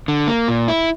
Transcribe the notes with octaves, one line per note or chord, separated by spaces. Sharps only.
D3
A#3
A#2
E4